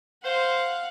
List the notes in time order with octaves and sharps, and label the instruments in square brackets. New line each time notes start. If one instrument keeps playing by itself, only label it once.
[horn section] C5 [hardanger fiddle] F5 F#5